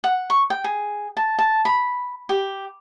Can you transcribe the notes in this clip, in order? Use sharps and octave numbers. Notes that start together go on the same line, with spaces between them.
F#5
C#6
G5
G#4
A5
A5
B5
G4